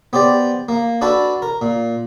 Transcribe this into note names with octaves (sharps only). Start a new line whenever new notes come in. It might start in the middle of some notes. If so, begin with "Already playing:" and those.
B3 G4 C5 D5
A#3
D4 F#4 A4 B4
A#4
A#2